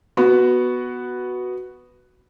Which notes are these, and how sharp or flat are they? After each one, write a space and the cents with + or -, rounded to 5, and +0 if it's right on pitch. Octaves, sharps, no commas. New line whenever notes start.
B3 +0 F#4 +0